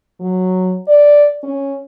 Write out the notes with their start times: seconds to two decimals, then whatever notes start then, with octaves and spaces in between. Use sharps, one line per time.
0.20 F#3
0.88 D5
1.44 C#4